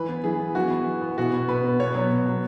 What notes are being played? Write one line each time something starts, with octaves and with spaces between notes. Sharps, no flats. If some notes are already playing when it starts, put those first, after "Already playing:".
Already playing: E3 B4
B3
E3 G#4
B3
E3 F#4
B3
E3
B3
B2 F#4
B3
B2 B4
B3
B2 C#5
F#3 B3
B2
F#3 B3